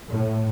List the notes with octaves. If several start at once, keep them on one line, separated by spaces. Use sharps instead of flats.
A2